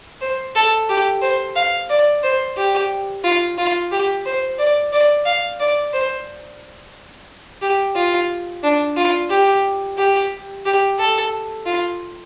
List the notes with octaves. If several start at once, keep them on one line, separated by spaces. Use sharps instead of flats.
C5
A4
G4
C5
F5
D5
C5
G4
F4
F4
G4
C5
D5
D5
F5
D5
C5
G4
F4
D4
F4
G4
G4
G4
A4
F4